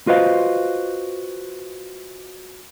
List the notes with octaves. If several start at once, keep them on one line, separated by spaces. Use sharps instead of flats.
F4 F#4 B4 C5 D#5 F5